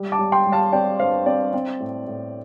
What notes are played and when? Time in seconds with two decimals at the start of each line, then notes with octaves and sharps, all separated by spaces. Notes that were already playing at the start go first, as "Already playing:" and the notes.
Already playing: G3
0.12 A5 D6
0.19 G3
0.32 G5 C6
0.46 G3
0.52 F5 A5
0.72 C4 D5 G5
1.00 G2 C5 F5
1.26 C4 D5
1.54 C4
1.80 A2
2.07 A2